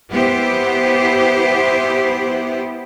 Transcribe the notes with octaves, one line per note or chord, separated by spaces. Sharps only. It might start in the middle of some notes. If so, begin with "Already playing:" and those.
B3 E4 G4 C5